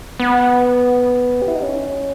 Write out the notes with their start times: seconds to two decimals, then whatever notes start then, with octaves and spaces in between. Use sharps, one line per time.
0.20 B3
1.42 G4
1.48 E4
1.55 D#4
1.63 C#4